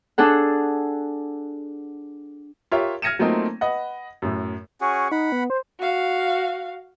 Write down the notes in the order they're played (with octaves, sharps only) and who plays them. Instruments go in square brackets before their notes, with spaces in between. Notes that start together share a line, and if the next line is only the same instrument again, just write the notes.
[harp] D4 G#4 A4 F#5
[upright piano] F4 G4 A#4 C#5 E5
F6 G#6 A#6 C#7 D#7 E7
F#3 A3 A#3 C4 D#4 F4
B4 D#5 F#5
F#2 A2
[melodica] C#4 F#4 G#4 [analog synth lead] C#6
[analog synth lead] D#4 [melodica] F#5 B5
[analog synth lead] B3
C5
[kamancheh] F#4 F5